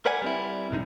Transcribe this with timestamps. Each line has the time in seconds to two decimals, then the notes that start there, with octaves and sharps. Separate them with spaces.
0.06 A#4 B4 D5 F#5 G#5
0.22 G3 C4 E4
0.71 C2 G#2 D3 D#4